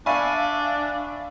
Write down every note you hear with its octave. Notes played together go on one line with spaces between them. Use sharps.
D4 D5 E5 F5 G#5 B5 C#6